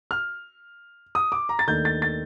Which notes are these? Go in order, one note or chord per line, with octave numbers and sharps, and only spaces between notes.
F6
D#6
D6
A#5
A6
D#2 D#3 A3 D4 G6
A6
A6